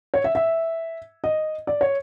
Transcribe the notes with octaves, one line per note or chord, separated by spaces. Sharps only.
C#5
E5
E5
D#5
D5
C#5